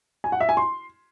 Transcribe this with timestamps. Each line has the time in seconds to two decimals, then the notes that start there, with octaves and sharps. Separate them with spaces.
0.24 G#5
0.32 F#5
0.41 E5
0.49 G#5
0.57 C6